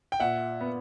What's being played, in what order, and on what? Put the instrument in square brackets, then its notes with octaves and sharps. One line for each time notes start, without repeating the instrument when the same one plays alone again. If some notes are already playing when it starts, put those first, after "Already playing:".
[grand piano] G5
[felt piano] A#2 [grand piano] E5 F#5
[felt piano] B3